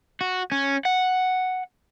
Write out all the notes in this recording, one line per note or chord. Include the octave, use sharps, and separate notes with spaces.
F#4
C#4
F#5